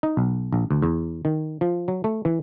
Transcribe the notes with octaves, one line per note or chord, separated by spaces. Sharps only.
D#4
B1
A#1
D2
E2
D#3
F3
F#3
A3
E3